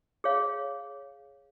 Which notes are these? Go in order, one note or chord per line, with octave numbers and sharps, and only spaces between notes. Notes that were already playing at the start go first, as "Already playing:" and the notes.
G#4 C#5 F5